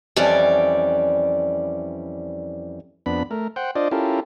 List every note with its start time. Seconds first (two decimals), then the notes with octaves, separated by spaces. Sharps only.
0.16 F2 E3 G3 C#4 D5
3.06 F2 B3 D4 B5
3.31 A3 A#4
3.56 C5 F#5 G5
3.76 D4 F4 C5 D5 D#5
3.91 C#4 E4 F4 G4 A4 A#4